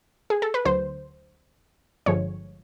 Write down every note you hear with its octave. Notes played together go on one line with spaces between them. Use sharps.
G#4
A4
B4
D2 D3 F#3 C5
G1 G2 D3 F3 G#3 C#5